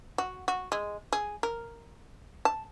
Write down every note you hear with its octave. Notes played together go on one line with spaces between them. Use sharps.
F#4
F#4
G#3
G#4
A#4
A5